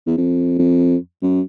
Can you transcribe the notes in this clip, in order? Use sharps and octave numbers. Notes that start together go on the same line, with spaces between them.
E2
F2
F2
F#2